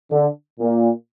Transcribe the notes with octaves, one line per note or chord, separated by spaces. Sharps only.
D3
A#2